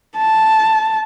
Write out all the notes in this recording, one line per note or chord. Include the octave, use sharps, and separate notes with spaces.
A5